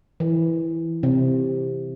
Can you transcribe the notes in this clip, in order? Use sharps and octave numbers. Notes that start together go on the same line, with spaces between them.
E3
C3